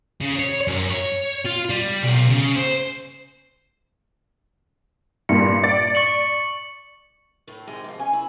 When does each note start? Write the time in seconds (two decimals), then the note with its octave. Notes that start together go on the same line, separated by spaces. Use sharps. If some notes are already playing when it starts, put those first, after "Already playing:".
0.21 C#3
0.39 C#5
0.68 F#2
0.91 C#5
1.46 F4
1.70 G3
2.04 B1
2.30 C#3
2.56 C5
5.29 G2 A#2 C#7
5.63 D5 A6
5.95 C#6 C#7 F#7
7.47 A2 A3
7.67 C3 D#3 G#3
7.84 G#2 F3
7.99 G#3 C#4 G#5
8.13 E4